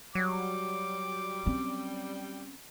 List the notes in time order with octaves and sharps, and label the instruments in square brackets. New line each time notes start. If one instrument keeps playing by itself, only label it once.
[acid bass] F#3 [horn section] G3 [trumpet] D6
[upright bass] C4 C#4